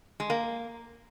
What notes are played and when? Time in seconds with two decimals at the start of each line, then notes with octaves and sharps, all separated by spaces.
0.20 G#3
0.30 A#3